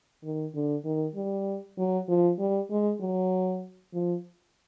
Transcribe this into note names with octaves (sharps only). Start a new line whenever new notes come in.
D#3
D3
D#3
G3
F#3
F3
G3
G#3
F#3
F3